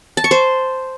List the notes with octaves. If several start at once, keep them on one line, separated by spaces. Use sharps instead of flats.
A5
C#6
C5